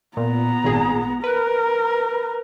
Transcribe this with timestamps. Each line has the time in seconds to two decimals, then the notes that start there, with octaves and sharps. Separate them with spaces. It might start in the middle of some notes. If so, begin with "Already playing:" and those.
0.17 A#2 B3 A#5
0.64 G#1 A#2 G#4
1.24 A#4 B4